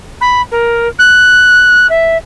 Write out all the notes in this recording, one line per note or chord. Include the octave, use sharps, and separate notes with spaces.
B5
A#4
F#6
E5